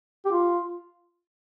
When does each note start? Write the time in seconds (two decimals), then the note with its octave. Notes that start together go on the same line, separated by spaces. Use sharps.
0.25 G4
0.31 F4